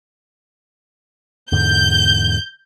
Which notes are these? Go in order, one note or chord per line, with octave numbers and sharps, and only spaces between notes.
E2 G#2 D3 G6